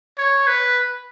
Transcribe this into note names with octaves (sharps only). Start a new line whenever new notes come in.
C#5
B4